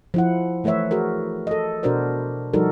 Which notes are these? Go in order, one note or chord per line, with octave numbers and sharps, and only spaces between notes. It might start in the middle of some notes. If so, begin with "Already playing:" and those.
F3 E4 F#5
E3 A3 B4 C#5 E5
F#4 G#4 A#4
A4 D#5
B2 D4 F#4 A#4 C5 D5
F3 G3 D#4 F#4 A4 A#4